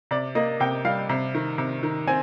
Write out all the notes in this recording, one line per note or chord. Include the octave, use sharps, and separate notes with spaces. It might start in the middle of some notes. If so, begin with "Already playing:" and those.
C3 D5
A#3 D#5
C3 G5
G3 F5
C3
D#3
C3
D#3
C4 G#5